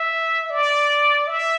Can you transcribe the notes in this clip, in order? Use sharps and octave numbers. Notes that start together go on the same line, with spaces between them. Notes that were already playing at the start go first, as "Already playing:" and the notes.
Already playing: E5
D5
E5